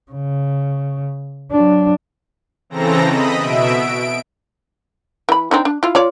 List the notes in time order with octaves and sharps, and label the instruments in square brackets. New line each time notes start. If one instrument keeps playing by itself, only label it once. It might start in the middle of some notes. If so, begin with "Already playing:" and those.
[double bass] C#3
F#3 D4
[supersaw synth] C#3 E3 C4 A4 A#5 A#6
D#5 B5 D#6
B2 E5 D7
D7
[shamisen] E3 B5
C4 D4 D#4
D4
E4 F4
F4 C#5 D5